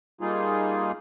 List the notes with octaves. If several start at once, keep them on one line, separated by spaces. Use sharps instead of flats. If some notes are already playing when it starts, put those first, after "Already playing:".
G3 A#3 D#4 F4 G#4